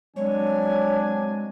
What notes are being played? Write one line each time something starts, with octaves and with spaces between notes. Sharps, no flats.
F#3 G#3 C4 D4 C#5 G#5